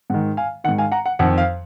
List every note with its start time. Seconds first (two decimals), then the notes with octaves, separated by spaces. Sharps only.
0.10 G#2 F#5
0.14 D#3
0.37 F5 G#5
0.64 D#3 F#5
0.69 G#2
0.78 F5 G#5
0.92 F#5 A#5
1.06 F#5
1.19 F2 D#3 F#5
1.38 F5